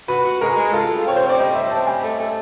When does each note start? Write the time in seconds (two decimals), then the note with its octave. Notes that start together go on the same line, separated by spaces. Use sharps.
0.08 F#4 B4
0.24 F#4
0.41 G#3 A#4
0.57 G#3
0.73 F4 A4
0.90 G3
1.06 C4 C#5
1.16 C5
1.22 C4
1.29 D5
1.39 G3 D#5
1.54 G3 E5
1.71 C4 A5
1.86 G3 G#5
2.04 A3
2.20 A3